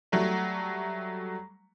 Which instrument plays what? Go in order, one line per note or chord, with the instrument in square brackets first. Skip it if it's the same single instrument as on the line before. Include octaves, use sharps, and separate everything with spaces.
[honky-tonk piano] F#3 G3 A3